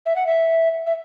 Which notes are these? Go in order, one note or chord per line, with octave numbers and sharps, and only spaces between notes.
E5
F#5
E5
E5